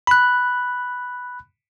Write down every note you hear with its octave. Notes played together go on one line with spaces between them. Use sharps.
B5 F#6